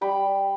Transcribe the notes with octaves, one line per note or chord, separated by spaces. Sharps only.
G3 G5 B5